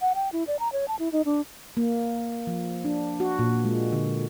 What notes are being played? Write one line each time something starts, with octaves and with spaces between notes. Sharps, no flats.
F#5
G5
E4
D5
A#5
C#5
A5
E4
D#4
D4
A#3
F3
D4
F#4
A#2
G#3
D3